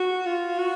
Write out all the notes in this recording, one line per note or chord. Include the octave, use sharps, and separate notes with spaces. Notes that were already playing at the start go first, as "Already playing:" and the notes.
Already playing: F#4
F4
F#4